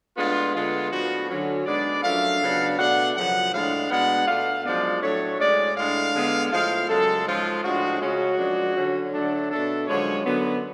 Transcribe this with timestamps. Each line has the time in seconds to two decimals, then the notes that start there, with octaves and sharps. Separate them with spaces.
0.16 A2 G#3 B3 D4 F4
0.54 D3 G#3 B3 F4
0.91 A2 F3 B3 D4 F#4
1.29 D3 F#3 C#4
1.65 G#2 G#3 B3 D4 D5
2.03 F#2 F3 A3 D4 F5
2.40 C#3 F#3 B3 D4
2.78 B2 A3 D4 F#5
3.15 F#2 C#3 F3 F#5
3.53 A2 G#3 D4 F5
3.90 B2 G#3 B3 D4 F#5
4.27 B2 A3 D4 F5
4.65 F#2 F3 G#3 B3 D4 D5
5.01 A2 F#3 A3 D4 C#5
5.39 A2 G#3 C#4 D5
5.76 A2 G#3 D4 F5
6.14 D3 G#3 B3 D4
6.51 A2 F3 G#3 F5
6.88 F#2 C#3 G#3 A4
7.26 G#2 F3 G#3 C#4 F4
7.63 A2 F3 G#3 D4 F#4
8.00 C#3 G#3 C#4 F#4
8.38 F#2 F3 G#3 D4
8.75 D3 F#3 C#4
9.13 D3 F#3 A3 D4
9.50 B2 A3 D4 A4
9.87 F#2 D3 F3 G#3 C#5
10.25 F#2 D3 F#3 B3